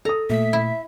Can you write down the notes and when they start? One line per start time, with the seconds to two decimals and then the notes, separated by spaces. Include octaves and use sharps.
0.05 A4 A#5 D#6
0.30 A#2 A3 E5 B6
0.53 E4